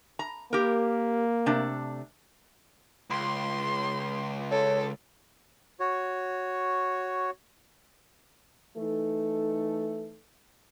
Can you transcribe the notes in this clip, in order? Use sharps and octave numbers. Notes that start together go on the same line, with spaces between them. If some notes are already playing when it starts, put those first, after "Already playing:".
A#5
A#3 G4 A#4
C3 A3 D4
C#2 C6
A4 C#5
F#4 C#5
E3 A3 D#4 A4